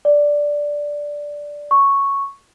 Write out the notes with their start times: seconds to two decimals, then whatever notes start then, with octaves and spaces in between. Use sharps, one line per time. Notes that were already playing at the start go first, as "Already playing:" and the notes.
0.05 D5
1.71 C#6